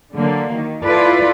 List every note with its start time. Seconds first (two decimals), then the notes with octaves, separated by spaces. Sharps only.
0.14 D3 F#3 A#3
0.52 D#3
0.85 E4 F4 A4 B4 D5